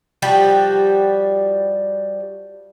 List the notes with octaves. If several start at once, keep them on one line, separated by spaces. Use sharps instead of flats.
F3 G3 F#4 G4